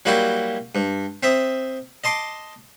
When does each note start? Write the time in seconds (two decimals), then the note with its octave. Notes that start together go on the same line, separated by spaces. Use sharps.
0.05 F#3 G3 A#3 E4 F#4 G4
0.75 G2
1.23 C4 E5 D#6
2.04 D#5 A5 C6 D6